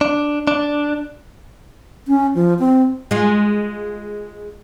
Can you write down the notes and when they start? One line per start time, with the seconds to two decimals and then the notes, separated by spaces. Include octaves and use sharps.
0.01 D4
0.47 D4
2.08 C#4
2.35 F3
2.59 C4
3.11 G#3 F4